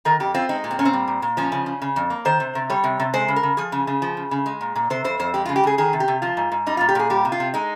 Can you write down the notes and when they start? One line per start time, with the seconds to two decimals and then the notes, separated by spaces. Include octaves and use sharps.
0.05 D#3 A#4
0.20 F2 G4
0.34 C4 F4
0.49 G#3 D#4
0.64 A#2
0.71 C4
0.79 A#2 C#4
0.85 C4
0.93 G3
1.07 A#2
1.22 A#2
1.37 F3 C#4
1.52 C#3
1.66 C#3
1.82 C#3
1.96 F2
2.10 A#3
2.25 D#3 C5
2.40 C3
2.55 C3
2.70 G3 C#5
2.84 C3
3.00 C3
3.14 G#3 C5
3.28 C#3
3.36 A#4
3.43 C#3
3.57 F3 G#4
3.72 C#3
3.87 C#3
4.02 F3
4.17 C#3
4.31 C#3
4.46 G#3
4.61 A#2
4.75 A#2
4.90 C3 C5
5.04 F2 C5
5.19 F2 C5
5.34 G#3 G4
5.45 F4
5.49 C#3
5.56 G4
5.63 C#3 G#4
5.78 D#3 G#4
5.93 C3
6.00 G4
6.08 C3
6.22 F3 F4
6.37 G#2
6.52 G#2
6.66 G3 D#4
6.77 F4
6.80 A#2
6.89 G4
6.95 A#2 G#4
7.10 G3 G4
7.25 C3
7.32 F4
7.40 C3
7.54 G#3 D#4